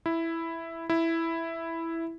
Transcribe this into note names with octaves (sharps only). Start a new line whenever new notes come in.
E4
E4